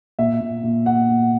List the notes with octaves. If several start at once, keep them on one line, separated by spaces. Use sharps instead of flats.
A#2 E5
A#2
A#2
A#2 F#5
A#2